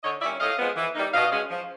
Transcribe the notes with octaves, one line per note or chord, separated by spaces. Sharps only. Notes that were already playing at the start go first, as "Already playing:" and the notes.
D3 C#5 D#5
G3 A#3 C#4 D5 E5
A2 D#5 F5
F3 G#3 B3
E3
G3 A#3 D#4
B2 D#5 F5
G#3 C#4
F3